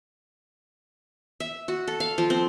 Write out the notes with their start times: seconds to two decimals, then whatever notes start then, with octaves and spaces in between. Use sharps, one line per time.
1.40 E5
1.68 F#4
1.87 A4
2.00 F5
2.18 F3
2.30 C4